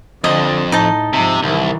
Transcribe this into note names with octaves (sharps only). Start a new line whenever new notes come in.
F2 D3 D#5
A2 D#4 D#5 A5
G#2 C3 F3
C2 D#3 E3